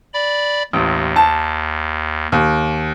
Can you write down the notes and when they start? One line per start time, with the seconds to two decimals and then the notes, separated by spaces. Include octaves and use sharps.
0.14 D5 B5
0.73 A1 D#2
1.16 A5
2.32 D#2